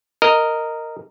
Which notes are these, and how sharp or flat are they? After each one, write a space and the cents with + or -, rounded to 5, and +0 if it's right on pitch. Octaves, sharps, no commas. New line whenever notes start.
A#4 -10 D#5 +0